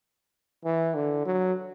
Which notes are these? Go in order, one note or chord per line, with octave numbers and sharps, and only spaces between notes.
E3
D3
F#3